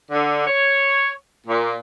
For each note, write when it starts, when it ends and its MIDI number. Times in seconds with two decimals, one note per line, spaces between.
0.11 0.46 50
0.46 1.09 73
1.47 1.75 46